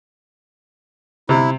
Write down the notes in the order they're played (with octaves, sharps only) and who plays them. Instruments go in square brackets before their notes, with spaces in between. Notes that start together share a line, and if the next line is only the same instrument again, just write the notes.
[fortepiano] C3 [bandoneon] E4